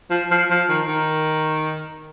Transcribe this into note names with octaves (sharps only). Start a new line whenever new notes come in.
F3
F3
F3
D#3
D#3